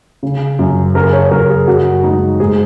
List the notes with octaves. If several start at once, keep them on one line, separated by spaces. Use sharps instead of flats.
C#3
F#2
C#3 A#4
C#5
F#2 A#4
G#4
F#2 F#4
G#3 D#4
G#2 G#4